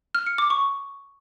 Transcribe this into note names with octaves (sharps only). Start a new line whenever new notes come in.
F6
C#7
D6
C#6